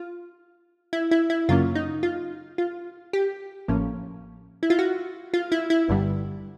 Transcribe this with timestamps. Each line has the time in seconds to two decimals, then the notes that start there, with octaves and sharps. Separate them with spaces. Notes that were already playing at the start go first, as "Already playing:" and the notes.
Already playing: F4
0.93 E4
1.11 E4
1.30 E4
1.49 F#2 C#3 F#3 A#3 C#4 F4
1.75 D#4
2.03 F4
2.58 F4
3.13 G4
3.68 A1 A2 F3 A#3 C#4
4.63 E4
4.70 F4
4.79 F#4
5.34 F4
5.52 E4
5.70 E4
5.88 G1 G2 D3 G3